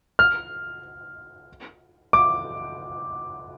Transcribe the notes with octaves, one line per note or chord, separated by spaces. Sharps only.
F6
D6